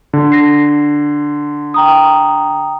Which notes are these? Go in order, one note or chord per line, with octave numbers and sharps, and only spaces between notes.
D3
A#6 C7
G5 A#5 D#6